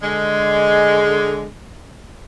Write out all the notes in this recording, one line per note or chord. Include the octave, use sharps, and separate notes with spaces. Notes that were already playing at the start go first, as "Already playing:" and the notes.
D3 G#3